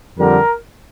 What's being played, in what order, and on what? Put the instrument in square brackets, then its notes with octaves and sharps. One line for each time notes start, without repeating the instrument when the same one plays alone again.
[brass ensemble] F2 D3 G3 A#4